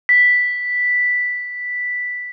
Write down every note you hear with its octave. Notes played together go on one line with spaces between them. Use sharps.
B6